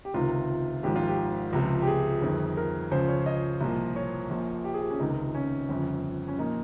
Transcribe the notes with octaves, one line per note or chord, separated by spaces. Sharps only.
G4
C#2 C3 D#3 F4
G#1 G#2 F3 G4
F4
G4
C#2 C3 F3
G4
G#4
G1 F2 D#3
A#4
C#2 C#3 F3 C5
C#5
D#5
C2 A#2 F3
C#5
A#1 A#2 F3
G4
G#4
G4
C#4
C#2 C3 D#3 D#4
C#4
G1 F2 C#3
C#4
A#2 F3 D#4